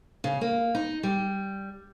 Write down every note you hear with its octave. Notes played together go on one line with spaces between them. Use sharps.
C#3
A#3
D#4
G3